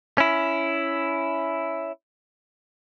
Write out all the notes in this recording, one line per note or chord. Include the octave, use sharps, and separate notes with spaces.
C#4 E4